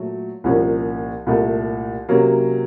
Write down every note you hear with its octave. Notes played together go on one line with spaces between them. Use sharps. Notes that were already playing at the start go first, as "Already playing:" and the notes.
Already playing: A#2 F#3 A3
C2 A#2 F3 A#3 C#4
C2 A#2 A3
C3 F#3 A#3 C#4